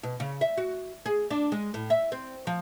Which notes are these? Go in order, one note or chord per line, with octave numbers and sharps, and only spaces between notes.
B2
C#3
E5
F#4
G#4
D4
G#3
A2
E5
C4
F3